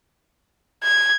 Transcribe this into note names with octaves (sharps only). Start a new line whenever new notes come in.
G#6